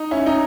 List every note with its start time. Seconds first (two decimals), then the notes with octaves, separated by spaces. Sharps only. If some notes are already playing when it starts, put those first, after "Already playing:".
Already playing: D#4
0.11 C#4 E4
0.26 D#4